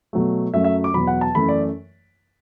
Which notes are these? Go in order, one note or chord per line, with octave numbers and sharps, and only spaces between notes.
B2 F#3 A3
F#2 F#3 A3 E5
E5
D6
E2 B2 F#3 B5
F#5
A5
F#2 E3 A3 B5
D5